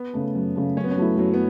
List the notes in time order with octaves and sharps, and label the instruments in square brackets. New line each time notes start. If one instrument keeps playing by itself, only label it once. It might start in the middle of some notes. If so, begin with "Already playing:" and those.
Already playing: [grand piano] B3
[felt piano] C#3 A3
F#2
C#3 A3
[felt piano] F#2 [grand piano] C#4
[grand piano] B3
C#4
[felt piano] F#3 A3 E4
[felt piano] F#2 [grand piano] F#3
[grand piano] B3